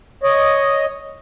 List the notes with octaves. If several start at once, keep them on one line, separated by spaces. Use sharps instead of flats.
C#5 D#5